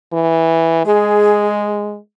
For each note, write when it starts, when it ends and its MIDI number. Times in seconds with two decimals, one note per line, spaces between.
0.13 0.83 52
0.85 1.97 56
0.85 1.71 68